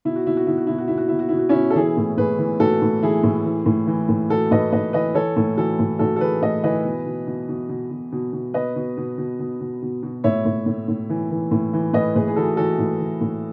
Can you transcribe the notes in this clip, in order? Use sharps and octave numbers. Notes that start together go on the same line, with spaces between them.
B2 E4
F#4
B2 E4
F#4
B2 E4
F#4
B2 E4
F#4
B2 E4
F#4
B2 E4
F#4
B2 E4
F#4
B2 C#4 E4
A4
E3 E4 G#4
A2
A2 G#4 B4
E3
A2 F#4 A4
A2
E3 E4 G#4
A2
E3
A2
E3
A2
A2 F#4 A4
A2 B4 D#5
A2 B4 D#5
E3 B4 D#5
E3 A4 C#5
A2
E3 F#4 A4
A2
A2 F#4 A4
A4
E3 G#4 B4
A2 B4 D#5
E3 B4 D#5
B2
B2
B2
B2
B2
B2
B2
B2
B2 B4 D#5
B2
B2
B2
B2
B2
B2
B2
A2 C#5 E5
A2
A2
A2
E3
E3
A2
E3
A2 B4 D#5
A2 G#4 B4
G#4
E3 F#4 A4
E3 F#4 A4
A2
E3
A2